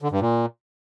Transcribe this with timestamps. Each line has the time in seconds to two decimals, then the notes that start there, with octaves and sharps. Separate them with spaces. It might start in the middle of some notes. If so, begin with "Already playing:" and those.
0.02 D3
0.11 G2
0.21 A#2